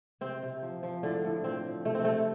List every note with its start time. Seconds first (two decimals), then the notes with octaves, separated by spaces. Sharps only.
0.21 C3 C4
0.43 C3
0.62 F3
0.83 F3
1.03 A2 D3 D4
1.25 A2
1.44 F3 C4
1.66 F3
1.85 C3 A3
1.95 C4
2.04 C3 A3